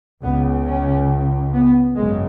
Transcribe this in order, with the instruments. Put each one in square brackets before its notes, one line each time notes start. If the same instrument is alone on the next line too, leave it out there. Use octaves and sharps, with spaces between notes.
[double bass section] C#2 C#3 B3
C#4
B3
G#1 F#2 C#3 G#3